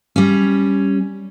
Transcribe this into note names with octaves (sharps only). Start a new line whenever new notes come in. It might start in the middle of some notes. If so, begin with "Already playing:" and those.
G3 C#4